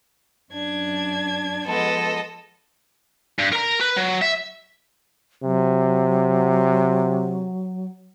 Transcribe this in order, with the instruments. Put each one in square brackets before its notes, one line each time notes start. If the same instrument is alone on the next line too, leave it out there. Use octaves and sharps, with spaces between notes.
[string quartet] F#2 D4 G#6
[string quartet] F3 G#3 B3 [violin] A4 D#5
[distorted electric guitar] G2
A#4 A#5
B4
F#3
E5
[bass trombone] C3 [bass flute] F#3